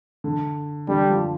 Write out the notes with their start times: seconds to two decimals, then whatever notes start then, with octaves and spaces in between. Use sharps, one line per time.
0.24 D3
0.88 D3 G3
1.10 F3